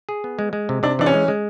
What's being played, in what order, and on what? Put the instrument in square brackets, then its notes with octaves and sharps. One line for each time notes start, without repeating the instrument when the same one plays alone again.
[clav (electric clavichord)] G#4
B3
G#3
G#3
C3
[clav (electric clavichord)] C3 [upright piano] D4
[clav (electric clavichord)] E3 [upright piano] D4
[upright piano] C#4
[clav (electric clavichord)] G#3
G#3